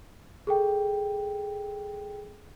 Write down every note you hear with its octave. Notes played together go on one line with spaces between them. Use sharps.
G#4 A4 G5